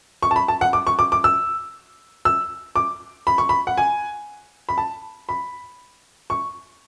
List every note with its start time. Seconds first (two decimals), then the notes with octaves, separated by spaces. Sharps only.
0.23 C#6
0.31 A5
0.36 B5
0.48 A5
0.61 F#5
0.73 D6
0.87 C#6
0.99 D6
1.12 D6
1.24 E6
2.25 E6
2.76 D6
3.27 B5
3.38 C#6
3.49 B5
3.67 F#5
3.78 G#5
4.69 B5
4.78 A5
5.29 B5
6.30 C#6